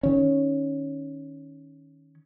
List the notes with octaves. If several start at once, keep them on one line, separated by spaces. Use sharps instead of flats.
D#3 C#4